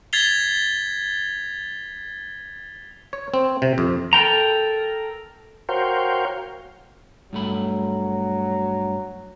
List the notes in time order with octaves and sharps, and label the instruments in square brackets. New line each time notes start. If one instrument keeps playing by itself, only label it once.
[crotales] G#6 A6 B6 C7 F7 G7
[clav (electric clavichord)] C#5
C4
C3
F2
[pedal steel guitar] A4 A#4 G5 A#5
[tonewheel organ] F#4 A#4 C5 C#5 F5 G5
[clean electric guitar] G2 A3 B5 [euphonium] F#3